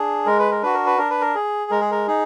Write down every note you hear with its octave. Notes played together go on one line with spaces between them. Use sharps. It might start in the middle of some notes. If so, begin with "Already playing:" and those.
Already playing: D4 G#4
G#3 A#4
B4
A#4
D4 F#4 B4
A#4
B4
D4 A#4
B4
A#4
G#4
G#3 A#4
G#4
A#4
D#4 G#4